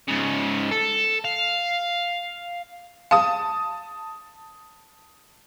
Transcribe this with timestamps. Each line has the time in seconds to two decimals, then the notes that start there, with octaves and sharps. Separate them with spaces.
0.08 G#2 C#3
0.71 A4
1.25 F5
3.11 F5 A5 D#6